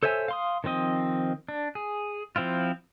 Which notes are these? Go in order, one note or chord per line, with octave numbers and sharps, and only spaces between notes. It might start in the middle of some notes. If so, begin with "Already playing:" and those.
A4 C5 C#5 E5 G#5
F5 C6 D#6
D#3 F3 C4 D#5
D4
G#4
F3 C4 E4 F4